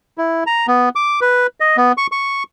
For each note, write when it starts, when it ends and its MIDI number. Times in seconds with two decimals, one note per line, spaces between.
0.18 0.44 64
0.46 0.66 82
0.68 0.89 59
0.95 1.20 86
1.21 1.47 71
1.60 1.77 75
1.77 1.92 59
1.97 2.07 85
2.12 2.43 85